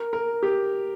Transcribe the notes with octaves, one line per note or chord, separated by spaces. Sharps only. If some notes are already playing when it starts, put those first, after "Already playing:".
Already playing: A#4
A#4
G4